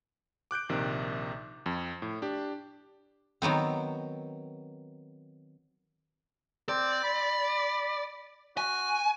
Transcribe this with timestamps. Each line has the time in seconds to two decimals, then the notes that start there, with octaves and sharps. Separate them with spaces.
0.51 D6 F#6 G6 D7
0.69 A#1 C3 D#3
1.66 F2
2.02 A2
2.22 D4 G4
3.42 D#3 F#3 B3 C4
6.69 C4 D5
7.04 B5
8.57 F#4 G#5